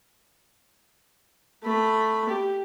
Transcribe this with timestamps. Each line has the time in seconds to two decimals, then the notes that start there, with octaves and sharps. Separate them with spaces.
1.64 A3 B5
2.29 G4